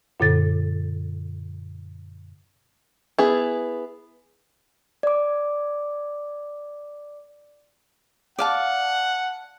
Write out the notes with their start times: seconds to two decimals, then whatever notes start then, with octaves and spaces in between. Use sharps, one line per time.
0.20 F#2 A#2 D3 A4 A6
3.19 B3 E4 G#4
5.03 D5 D6
8.39 D5 F5 F#5 A5